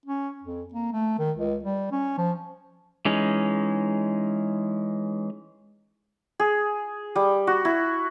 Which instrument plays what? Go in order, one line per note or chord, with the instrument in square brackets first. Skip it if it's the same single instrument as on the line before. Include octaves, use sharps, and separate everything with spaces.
[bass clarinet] C#4
F2
A#3
A3
D#3
C#2
G3
C#4
F3
[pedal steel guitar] E3 G#3 C#4 D#4
[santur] G#4
G3
F#4
E4